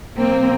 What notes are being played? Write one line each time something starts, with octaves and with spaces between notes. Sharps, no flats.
B2 F#3 A#3 C4